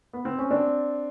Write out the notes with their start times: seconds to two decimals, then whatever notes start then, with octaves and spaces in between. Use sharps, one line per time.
0.13 B3
0.25 C4
0.38 C#4
0.51 C4 D4